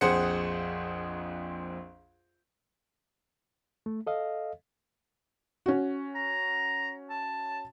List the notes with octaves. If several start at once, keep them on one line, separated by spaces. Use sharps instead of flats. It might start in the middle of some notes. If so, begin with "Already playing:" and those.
A#1 F2 G#4 C5 F#5 C#7
A3
A4 D#5 F5
C#4 F#4
A#5
A5